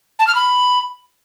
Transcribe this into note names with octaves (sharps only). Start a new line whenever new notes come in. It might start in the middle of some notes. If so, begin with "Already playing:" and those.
A5
F6
B5